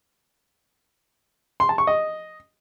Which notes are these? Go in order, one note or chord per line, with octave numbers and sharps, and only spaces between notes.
C6
A5
C#6
D#5